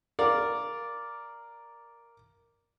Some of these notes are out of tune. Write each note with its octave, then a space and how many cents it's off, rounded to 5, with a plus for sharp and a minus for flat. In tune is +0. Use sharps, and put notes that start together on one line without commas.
A#4 +0 D5 -5 F5 +0